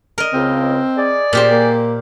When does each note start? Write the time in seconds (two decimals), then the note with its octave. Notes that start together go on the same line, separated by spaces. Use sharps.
0.18 A#4 D#5
0.33 C#2 C#3 C4
0.97 G#4 D5
1.33 A#2 G4 C5
1.51 A#3